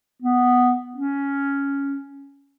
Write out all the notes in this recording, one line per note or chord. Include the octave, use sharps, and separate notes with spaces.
B3
C#4